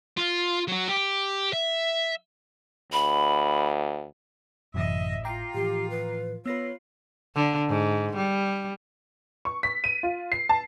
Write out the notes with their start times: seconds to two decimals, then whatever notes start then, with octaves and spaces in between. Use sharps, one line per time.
0.17 F4
0.68 F#3 F#4
0.89 G4
1.53 E5
2.92 D2 B5
4.74 G#1 F#2 A2 C3 E3 D#5 E5
5.24 F4 G5 A#5 D6
5.55 A2 E3 F3 G4
5.90 B4
6.46 B3 F4 B4 C#5 E6 A#6
7.35 D3
7.69 G#2
8.16 G3
9.45 C#6
9.63 B6
9.84 D#7
10.03 F4
10.32 C7
10.49 A5